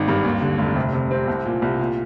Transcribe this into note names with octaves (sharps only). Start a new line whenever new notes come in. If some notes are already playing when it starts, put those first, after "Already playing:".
Already playing: G#1 D#3
G2
D#2
D3
F1
C3
C3
C4
C2
A#2
C2
A#2